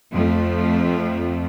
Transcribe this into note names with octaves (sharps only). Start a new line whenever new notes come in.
F2 F3 A3